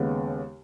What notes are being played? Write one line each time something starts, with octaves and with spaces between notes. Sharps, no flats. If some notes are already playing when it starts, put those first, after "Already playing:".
Already playing: D#2 C#3 G#3 B3